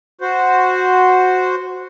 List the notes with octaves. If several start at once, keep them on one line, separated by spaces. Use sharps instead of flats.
F#4 C5